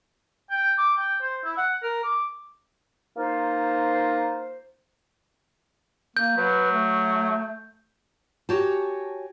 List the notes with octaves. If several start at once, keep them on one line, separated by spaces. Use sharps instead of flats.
G5
D6
G5
C5
E4
F#5
A#4
D6
A#3 D#4 F4 C5
A#3 G6
F#3 B4
A3
F#4 G4 C#5 G#5 A5